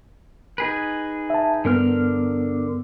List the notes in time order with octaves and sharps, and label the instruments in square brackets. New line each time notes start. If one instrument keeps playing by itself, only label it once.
[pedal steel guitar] D#4 G#4 B4
[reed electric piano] E5 A5
[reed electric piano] G2 B3 [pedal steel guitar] D3 A#4 F6